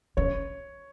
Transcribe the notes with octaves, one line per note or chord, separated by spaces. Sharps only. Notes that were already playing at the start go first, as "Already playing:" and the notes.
C#4 C#5